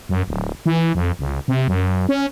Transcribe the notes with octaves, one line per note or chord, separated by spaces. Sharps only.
F#2
D1
E3
F2
C#2
C3
F#2
C#4